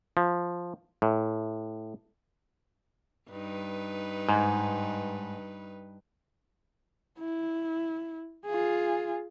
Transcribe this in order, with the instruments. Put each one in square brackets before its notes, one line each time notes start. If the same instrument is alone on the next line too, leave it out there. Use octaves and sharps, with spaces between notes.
[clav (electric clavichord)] F3
A2
[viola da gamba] G2 D#4 B4
[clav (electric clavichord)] G#2
[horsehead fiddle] E4
F4 G#4